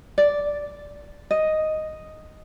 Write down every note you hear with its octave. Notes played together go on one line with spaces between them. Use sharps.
D5
D#5